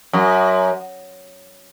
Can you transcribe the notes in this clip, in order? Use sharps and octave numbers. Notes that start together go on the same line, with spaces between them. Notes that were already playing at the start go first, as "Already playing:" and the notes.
F#2